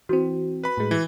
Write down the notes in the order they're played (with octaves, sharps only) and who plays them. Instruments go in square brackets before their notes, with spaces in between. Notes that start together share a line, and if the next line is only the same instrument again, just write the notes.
[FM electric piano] E3 C4 [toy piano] F#4
[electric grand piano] B4 B5
[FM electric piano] A2 G#3
[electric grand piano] E3